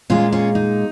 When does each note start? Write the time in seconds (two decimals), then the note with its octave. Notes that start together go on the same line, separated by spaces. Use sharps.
0.10 A#2 G#3 C#4 F4
0.32 C#4 F4
0.55 D#4